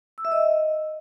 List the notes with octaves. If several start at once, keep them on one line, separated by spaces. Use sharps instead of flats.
E6
E5
D#5